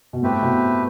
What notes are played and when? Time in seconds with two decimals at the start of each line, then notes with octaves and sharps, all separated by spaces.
0.13 B2
0.22 A2 A3 C4 G4 B4
0.42 B2